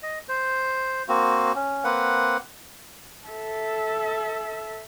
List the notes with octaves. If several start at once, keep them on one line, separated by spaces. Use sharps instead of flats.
D#5
C5
A#3 C4 F#4
C#4
A#3 C4 B4 F#5
A4 E5